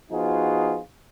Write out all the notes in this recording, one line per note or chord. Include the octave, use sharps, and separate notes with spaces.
F3 B3 D#4 F4 F#4 G#4